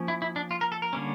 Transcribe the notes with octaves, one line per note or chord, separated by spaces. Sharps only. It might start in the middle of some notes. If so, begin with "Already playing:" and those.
Already playing: F3 A#3 C#4
E4
E4
D4
F4
A#4
A4
A#4
D3 G3 A#3 C#4